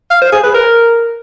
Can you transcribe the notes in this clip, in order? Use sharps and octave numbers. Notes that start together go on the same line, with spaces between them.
F5
C5
G#4
B4
A#4